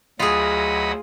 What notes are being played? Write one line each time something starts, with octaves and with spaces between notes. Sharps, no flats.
D2 F#3 F4 G#4 D#5 F#5 B5